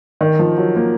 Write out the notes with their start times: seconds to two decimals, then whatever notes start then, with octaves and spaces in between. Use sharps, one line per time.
0.21 D#3
0.39 F3
0.58 F#3
0.76 A#3